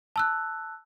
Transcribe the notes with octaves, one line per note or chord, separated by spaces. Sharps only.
A5 E6 F#6